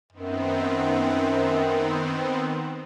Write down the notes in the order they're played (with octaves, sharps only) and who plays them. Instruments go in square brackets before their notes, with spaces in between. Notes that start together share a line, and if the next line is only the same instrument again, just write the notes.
[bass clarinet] F#2 [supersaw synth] D#3 B3 C4